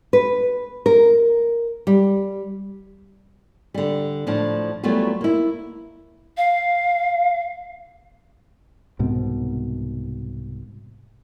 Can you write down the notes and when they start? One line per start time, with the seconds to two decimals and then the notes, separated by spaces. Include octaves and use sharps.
0.13 B4
0.86 A#4
1.87 G3
3.74 D3 G3
4.27 A2 F3 D4
4.83 E3 F#3 G3 A3 B3 F4
5.21 A#3 E4
6.37 F5
8.99 C2 G#2 B2 C4